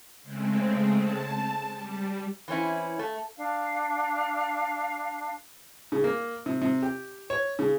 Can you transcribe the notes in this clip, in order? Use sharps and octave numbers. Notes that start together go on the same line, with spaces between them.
C#3 G#3 A3 C4
A5
G3
E3 C4 C#4 E4
A3
D4 F5
C#3
A#3
C3
C3
G4
C#5
C#3